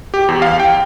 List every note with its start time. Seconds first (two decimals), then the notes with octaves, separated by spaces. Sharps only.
0.14 G4
0.29 E2
0.42 F5
0.60 G5